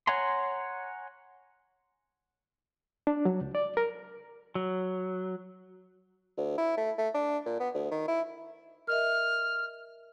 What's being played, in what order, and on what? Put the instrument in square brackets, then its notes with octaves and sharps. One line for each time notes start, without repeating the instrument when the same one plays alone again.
[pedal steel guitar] C#5 F#5 G#5 A#5 C6
[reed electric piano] D4
F#3
C#2
D5
A#4
[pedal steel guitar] F#3
[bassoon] D2
E4
A3
A3
D4
A#2
B3
D2
D#3
E4
[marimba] A#4 D#5 E5 [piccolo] F6